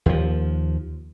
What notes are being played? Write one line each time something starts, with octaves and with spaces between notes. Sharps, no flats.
D#2 F3